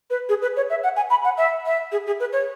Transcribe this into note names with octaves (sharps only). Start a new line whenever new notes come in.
B4
G#4
B4
C#5
E5
F#5
G#5
B5
F#5
E5
E5
G#4
G#4
B4
C#5